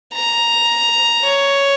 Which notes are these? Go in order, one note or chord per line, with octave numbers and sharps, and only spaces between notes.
A#5
C#5